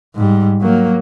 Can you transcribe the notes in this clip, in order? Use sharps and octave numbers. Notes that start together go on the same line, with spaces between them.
G#2 G3
F#3 A#3